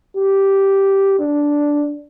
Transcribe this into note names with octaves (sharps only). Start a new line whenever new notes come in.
G4
D4